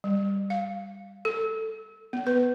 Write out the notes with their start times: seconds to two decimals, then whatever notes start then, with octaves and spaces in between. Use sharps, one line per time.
0.04 G3
0.50 F5
1.25 A4
2.13 B3
2.27 B4